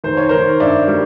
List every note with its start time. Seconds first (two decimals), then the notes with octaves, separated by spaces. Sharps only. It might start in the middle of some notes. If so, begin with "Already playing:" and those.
0.04 D#3 C5
0.17 C#5
0.29 D#3 A#4 C5
0.60 G2 D5 E5
0.88 G3